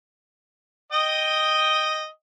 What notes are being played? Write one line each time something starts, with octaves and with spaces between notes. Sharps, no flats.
D#5 G5 D#6